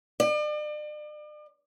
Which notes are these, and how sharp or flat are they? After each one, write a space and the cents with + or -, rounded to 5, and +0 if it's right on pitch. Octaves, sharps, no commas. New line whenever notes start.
D5 +40